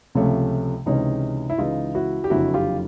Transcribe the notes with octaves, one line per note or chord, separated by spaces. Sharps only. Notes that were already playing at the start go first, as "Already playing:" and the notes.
C#2 C3 F3 A3 C#4
C#2 C3 E3 G#3 C#4 D#4
E4
C#2 C#3 E3 G#3 D#4 F4
E4 F#4
G4
F#1 F2 D3 F#3 E4 F#4
F4 G4